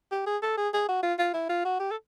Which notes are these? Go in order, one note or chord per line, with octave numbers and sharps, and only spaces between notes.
G4
G#4
A4
G#4
G#4
F#4
F4
F4
E4
F4
F#4
G4
A4